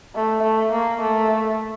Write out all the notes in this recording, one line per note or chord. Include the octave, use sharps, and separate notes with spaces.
A3
A3
A#3
A3